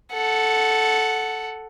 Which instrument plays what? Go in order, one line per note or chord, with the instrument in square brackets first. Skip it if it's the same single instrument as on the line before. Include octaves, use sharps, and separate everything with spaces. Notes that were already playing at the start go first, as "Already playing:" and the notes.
[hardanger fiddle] A4 F#5